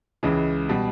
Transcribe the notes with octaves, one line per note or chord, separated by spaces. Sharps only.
C#2 C#3 E3 G#3
B2 G3